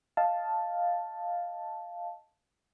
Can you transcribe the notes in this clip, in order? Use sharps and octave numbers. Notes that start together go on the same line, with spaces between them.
D#5 F5 A5